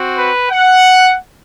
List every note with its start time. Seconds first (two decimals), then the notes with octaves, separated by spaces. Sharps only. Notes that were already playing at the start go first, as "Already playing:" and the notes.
Already playing: C4 F#4
0.17 B4
0.51 F#5